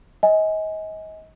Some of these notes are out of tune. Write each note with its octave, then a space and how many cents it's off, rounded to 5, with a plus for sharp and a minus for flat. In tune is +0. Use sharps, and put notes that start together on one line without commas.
D#5 +30 G#5 +0